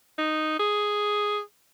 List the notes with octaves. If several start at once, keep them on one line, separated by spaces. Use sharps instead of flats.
D#4
G#4